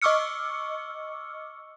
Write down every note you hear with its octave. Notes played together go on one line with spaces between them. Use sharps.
D#5 C#6 D6 E6 F6 C#7